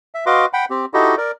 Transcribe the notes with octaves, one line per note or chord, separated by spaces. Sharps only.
E5
F#4 B4 D#5 F5 C6 D6
F#5 G5 B5
C4 G4
D#4 E4 F#4 G4 A4 D#5
A#4 D5